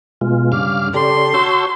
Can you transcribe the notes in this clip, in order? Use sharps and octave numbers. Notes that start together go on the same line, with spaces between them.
B2 G#3 F4
G2 C#3 F5 D6 F6
C#3 G4 A4 D5 C6
F#4 C#5 A5 E6 G6